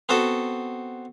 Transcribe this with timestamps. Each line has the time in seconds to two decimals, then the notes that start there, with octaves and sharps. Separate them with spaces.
0.09 B3 C4 F#4 A4